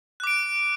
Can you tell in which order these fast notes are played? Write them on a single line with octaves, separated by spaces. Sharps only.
F#6 D6 D7